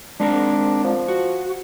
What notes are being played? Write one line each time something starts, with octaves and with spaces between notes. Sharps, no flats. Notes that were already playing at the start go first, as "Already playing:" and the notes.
G#3 C4 D4 A#4
F3
F#4